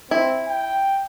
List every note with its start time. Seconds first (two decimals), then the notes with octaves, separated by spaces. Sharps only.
0.11 C4 E4
0.48 G5